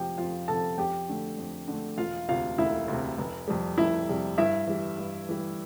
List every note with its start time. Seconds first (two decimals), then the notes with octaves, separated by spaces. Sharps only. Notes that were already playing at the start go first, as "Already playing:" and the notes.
Already playing: F2 C3 F3 G4 G5
0.18 F2 F4 F5
0.48 C3 F3 A4 A5
0.78 F2 G4 G5
1.08 D3 A3
1.38 F2
1.68 D3 A3
1.98 E1 F4 F5
2.29 D2 C3 F4 F5
2.58 E1 E4 E5
2.88 D2
2.93 C3
3.18 F1
3.48 F2 C3 G3
3.78 F1 E4 E5
4.09 F2 C3 G3
4.38 G2 E4 E5
4.68 E3 G3
4.98 G2
5.29 E3 G3